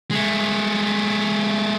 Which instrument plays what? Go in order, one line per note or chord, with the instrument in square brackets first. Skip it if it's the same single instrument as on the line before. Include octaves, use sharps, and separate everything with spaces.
[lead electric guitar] G#3 A3